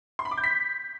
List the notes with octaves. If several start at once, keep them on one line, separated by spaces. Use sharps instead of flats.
C6
B5
D6
G6
B6